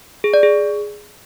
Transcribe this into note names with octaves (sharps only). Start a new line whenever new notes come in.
G#4
D5
G#4